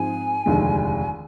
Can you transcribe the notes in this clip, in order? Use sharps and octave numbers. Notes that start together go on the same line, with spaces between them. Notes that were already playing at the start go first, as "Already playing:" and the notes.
Already playing: G#2 F3 C4 F4 G#4 G#5
F1 D#2 D3 G#3